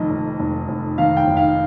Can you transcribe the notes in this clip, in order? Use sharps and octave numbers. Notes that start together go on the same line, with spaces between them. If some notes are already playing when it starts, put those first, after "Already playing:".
Already playing: F1 F2 D#3 D#5
F1
F1
F1
D#3 F5
G5
F1
F5